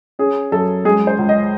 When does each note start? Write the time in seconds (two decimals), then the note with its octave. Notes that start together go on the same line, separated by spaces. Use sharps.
0.19 C#4 G#4
0.52 F#2 A4
0.85 G#3 G#4
1.07 C5
1.18 C#2
1.29 D#5